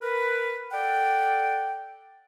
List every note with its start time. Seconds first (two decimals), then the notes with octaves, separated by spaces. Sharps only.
0.02 A#4 B4
0.71 A4 D5 F#5 G5